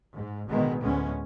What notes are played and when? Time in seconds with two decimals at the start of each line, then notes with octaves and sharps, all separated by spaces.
0.15 G#2
0.48 A1 B2 D3 D#3 G#3 B3
0.82 D2 A2 D3 G#3 B3 C#4